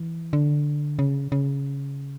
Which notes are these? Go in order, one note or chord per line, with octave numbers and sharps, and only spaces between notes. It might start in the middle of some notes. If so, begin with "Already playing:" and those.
Already playing: E3
D3
C#3
C#3